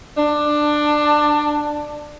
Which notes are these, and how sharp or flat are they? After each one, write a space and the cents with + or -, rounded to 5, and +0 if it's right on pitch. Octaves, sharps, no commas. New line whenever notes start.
D4 +15